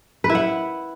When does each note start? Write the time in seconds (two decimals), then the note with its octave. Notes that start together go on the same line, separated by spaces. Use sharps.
0.24 B4
0.30 E4
0.35 F#5